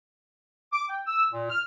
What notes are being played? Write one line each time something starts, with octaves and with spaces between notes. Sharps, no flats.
D6
G5
E6
A#2
F6